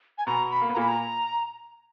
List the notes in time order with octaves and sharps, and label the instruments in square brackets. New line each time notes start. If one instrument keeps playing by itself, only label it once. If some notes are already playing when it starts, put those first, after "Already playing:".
[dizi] G#5
[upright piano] B2 B3 [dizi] A#5
[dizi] B5
[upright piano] A#3
B3
[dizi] A#5
[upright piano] A#2 A#3 [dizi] B5
[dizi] A#5